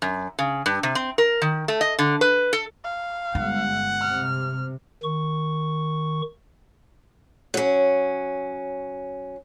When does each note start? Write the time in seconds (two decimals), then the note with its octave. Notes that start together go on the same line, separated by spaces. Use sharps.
0.02 F#2
0.39 C#3
0.66 G2
0.83 C3
0.95 C4
1.18 A#4
1.42 D#3
1.68 A3
1.81 D#5
1.99 D3
2.21 B4
2.53 A4
2.84 F5
3.35 G1 G#3 F#5
4.01 C3 F6
5.03 D#3 C#6
7.54 F#3 C#4